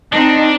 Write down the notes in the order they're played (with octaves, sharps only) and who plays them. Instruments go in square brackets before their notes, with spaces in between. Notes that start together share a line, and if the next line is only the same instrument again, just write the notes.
[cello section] C4 D#4 [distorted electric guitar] D4